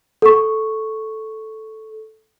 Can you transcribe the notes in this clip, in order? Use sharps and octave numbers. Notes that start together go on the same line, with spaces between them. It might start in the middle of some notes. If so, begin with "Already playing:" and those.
A4 C#6